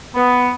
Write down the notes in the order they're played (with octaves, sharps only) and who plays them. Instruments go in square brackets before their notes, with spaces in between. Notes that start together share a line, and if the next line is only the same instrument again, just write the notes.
[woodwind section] B3